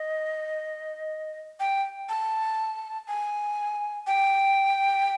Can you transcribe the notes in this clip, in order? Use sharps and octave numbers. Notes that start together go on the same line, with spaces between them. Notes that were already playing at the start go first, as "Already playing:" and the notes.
Already playing: D#5
G5
A5
G#5
G5